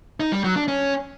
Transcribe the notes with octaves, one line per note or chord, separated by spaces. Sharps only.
D#4
G3
F#3
D4
C#4